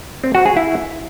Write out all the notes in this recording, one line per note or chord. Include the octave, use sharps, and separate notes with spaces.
C4
F#4
G#4
E4